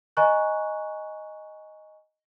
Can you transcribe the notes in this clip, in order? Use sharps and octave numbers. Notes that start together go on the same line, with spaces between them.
D#5 G#5 A#5 C#6 F#6